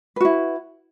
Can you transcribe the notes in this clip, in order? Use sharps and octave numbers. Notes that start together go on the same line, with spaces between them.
E4 F#4 B4